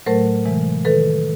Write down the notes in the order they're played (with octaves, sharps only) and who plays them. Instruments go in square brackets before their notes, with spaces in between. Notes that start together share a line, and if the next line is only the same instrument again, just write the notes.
[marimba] A2 F#3 A3 A#4 C5
C3 E3 G#3
D#3 A4 B4